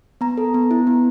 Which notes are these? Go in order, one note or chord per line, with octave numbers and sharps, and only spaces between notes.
B3 A#5
A4
B3
E4
B3